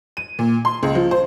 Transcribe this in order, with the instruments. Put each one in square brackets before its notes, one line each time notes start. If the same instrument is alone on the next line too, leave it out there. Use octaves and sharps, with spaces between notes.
[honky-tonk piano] D#7
A#2
C6
C#2
F3
C5